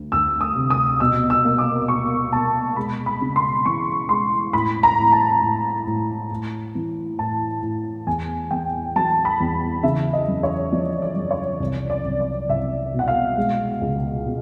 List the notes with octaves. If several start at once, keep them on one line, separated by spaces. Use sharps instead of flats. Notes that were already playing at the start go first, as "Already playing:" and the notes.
Already playing: D2
D2 E6
D#6
C3
D#6
B2 E6
E6
A#3
D6
B2 C#6
B2 A5
G#3 B5
B5
C#3
C6
E3 C#6
G#3 C6
A2 B5
A#5
A2
A5
A2
A2
A2
E3
A2 A5
A2
E2 G#5
E2 G5
F#3 A5
B5
E2
C#3 E5
D#5
F#2
C#5
F3 D5
D5
F#2
C#5
C2 D5
D5
C2
D5
C2 E5
B2
F#5
F5
G#3
C#2
B2